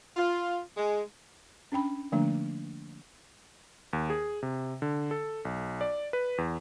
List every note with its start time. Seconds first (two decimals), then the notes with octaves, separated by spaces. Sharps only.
0.16 F4
0.77 G#3
1.72 C#4 D4 G5 B5
2.12 D3 F3 A3 A#3 D4
3.93 D#2
4.10 G#4
4.43 C3
4.82 D3
5.11 A4
5.45 B1
5.81 D5
6.13 B4
6.38 E2